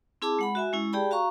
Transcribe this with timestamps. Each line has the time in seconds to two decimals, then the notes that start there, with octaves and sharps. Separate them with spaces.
0.22 C4 E4 G#4 A5 D6
0.39 G#3 F#5 B5
0.55 F#4 E5 G#5
0.73 G#3 C#4 E4
0.93 G4 G#4 D5 G5 A5 B5
1.11 F#4 F5 A#5 C#6